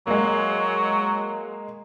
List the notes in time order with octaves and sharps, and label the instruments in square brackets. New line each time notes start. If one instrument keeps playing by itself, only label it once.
[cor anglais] F#3 [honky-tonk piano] G#3 A#3